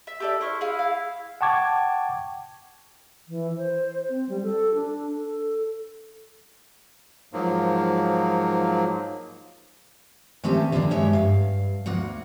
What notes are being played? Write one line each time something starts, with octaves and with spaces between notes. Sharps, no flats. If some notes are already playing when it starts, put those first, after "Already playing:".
E5
G4 A4 D5 E5
E4 C5 C#6 F6
G#4 F5
F5
F#5 G5 A5 C#6 D6 G#6
E3
C5
C4
G3
A4
D4
A4
G#2 F3 F#3 A#3
D#3 A3 C4 C#4 G4 A5
D3 D#3 A#3 B3 D4
G2 F#3 G#3 G4 C#5 E5
G2 F5
D2 A#3 F#4 F#5